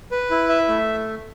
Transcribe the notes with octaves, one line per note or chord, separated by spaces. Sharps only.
B4
E4
E5
A3